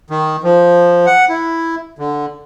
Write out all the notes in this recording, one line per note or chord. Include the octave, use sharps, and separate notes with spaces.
D#3
F3
F#5
E4
D3